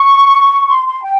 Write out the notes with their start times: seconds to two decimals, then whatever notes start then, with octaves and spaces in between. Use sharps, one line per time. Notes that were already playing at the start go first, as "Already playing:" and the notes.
Already playing: C#6
0.69 C6
0.86 C6
1.03 G5